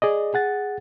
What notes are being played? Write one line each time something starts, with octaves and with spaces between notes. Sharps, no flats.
G#4 D5 D#5
G#4 F#5 A6